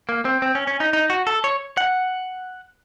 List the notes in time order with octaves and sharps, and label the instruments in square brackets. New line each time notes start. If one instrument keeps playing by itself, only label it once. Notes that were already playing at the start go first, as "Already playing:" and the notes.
[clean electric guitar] A#3
C4
C4
C#4
C#4
D#4
D#4
F#4
A4
C#5
F#5